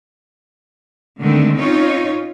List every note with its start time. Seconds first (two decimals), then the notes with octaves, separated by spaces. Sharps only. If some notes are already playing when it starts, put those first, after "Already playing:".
1.20 D3 D#3 G#3 A3 C4
1.56 C4 C#4 D#4 F4 C#5